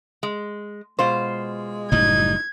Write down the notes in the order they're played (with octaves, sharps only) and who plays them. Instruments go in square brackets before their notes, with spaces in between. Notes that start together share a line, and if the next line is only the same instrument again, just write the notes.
[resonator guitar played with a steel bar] G#3
[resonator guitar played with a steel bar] B2 F4 C5 [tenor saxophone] G#3
[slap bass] F#1 A2 G3 [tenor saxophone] D#4 [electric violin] G#6